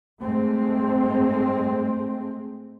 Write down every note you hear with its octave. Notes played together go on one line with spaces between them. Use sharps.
G#2 G#3 A3 C4